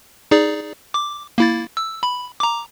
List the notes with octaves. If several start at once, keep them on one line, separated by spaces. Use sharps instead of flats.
D#4 G#4 D5
D6
A#3 E4 A6
E6
B5
A#5 D6